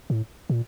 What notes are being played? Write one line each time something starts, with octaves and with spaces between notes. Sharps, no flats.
A2
A#2